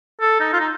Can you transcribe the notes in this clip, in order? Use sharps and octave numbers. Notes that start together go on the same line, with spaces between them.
A4
D#4
F4
D#4